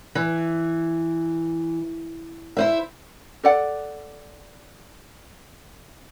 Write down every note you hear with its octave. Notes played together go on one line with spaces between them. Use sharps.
E3
E4 C5 E5
A4 D5 F#5